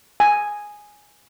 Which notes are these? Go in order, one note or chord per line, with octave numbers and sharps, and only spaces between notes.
G#5